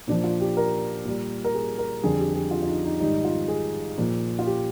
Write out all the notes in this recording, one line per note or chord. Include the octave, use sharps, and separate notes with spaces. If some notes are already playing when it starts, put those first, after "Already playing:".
A#2 F3 D4
F4
G4
A#4
A#2 G3
A#4
G#4
A#4
F2 D3 G3 G#4
G4
G#4
F4
F4
D#4
D#4
G#2 D#3 G3 D#4
F4
G#4
A#2 F3
F4
G4